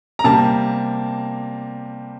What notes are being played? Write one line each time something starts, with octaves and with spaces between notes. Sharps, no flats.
A#5
C3 G3 A#3 A5